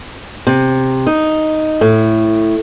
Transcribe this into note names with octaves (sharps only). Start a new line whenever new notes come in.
C3
D#4
A2